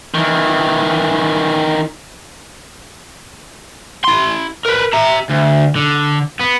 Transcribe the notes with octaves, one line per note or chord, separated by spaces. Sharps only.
D#3 E3
E4 C6
A#4 B4
E5 A#5
D2
D3
B3